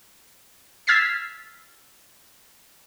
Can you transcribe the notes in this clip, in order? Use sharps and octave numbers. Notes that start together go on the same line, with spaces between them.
E6 F6 G#6 A6 B6 C7